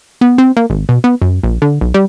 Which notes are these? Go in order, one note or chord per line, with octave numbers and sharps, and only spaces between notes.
B3
C4
A#3
G#1
B2
B3
F#2
A#1
D3
B1
G3